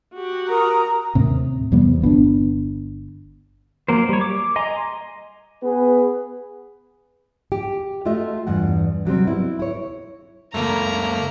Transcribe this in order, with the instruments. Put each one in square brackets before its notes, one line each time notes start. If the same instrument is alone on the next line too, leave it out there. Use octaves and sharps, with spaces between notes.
[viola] F#4 G4
[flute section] A#4 D#6 [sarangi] A#5
[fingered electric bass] D#2 A2 C3
E2 C3 G3 B3
G1 B3 C#4 D4
[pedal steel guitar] F#3 A#3 A#4 C5
G3 C#5
D6
D#5 G#5 A#5 C6
[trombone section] B3 G#4 B4
[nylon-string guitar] G4
A3 F4 F#4 D#5 E5
E2 G2 F#5
C3 F#3 G3 C4
B3 E4
E4 C#5
[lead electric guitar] C#2 F#2 [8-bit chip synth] A3 A#3 [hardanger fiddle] A#5